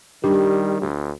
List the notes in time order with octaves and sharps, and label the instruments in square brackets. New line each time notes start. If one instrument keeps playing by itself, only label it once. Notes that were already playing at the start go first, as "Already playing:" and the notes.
[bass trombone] D#3 [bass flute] G3 [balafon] D4 [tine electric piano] G4
[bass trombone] D2